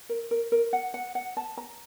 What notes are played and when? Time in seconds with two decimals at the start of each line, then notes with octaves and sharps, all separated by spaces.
0.09 A#4
0.31 A#4
0.52 A#4
0.73 F#5
0.94 F#5
1.15 F#5
1.37 A5
1.57 A#5